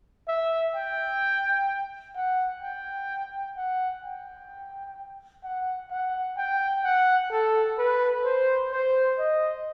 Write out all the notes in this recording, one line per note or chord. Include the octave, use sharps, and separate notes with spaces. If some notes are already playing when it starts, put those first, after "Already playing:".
E5
G5
F#5
G5
F#5
G5
F#5
F#5
G5
F#5
A4
B4
C5
C5
D#5